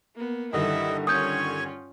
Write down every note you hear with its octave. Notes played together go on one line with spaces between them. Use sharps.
A#3 B3
G2 D3 D#3 E4 A4 D#5
C#4 F4 C#5 G#5 C#6 D#6 G6